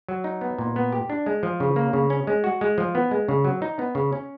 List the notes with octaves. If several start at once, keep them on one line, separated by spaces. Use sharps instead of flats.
F#3
D#4
B3
A#2
B3
G4
D4
G#3
F3
C#3
A#3
C#3
C#4
G#3
F#4
G#3
F3
B3
G#3
C#3
F#3
D#4
B3
C#3
C#4